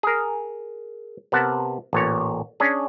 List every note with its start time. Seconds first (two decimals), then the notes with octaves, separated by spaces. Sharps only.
0.03 G#4 A#4
1.32 C3 B3 A#4 F#5 A5
1.93 A1 A#2 C#5
2.60 C#4 D4 G#4